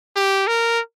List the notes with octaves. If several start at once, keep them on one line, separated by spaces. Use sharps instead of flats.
G4
A#4